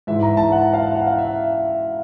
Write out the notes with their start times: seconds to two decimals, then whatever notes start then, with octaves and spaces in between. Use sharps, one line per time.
0.07 G#2 E3 E5
0.23 A#5
0.37 A5
0.52 F#5
0.74 F5
0.95 F#5
1.07 F5
1.18 E5